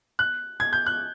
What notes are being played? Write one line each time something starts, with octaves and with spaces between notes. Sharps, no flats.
F#6
G#6
G6
F#6